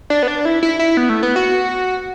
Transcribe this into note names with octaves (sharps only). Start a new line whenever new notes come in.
D4
B3
D4
E4
E4
E4
B3
A3
B3
F#4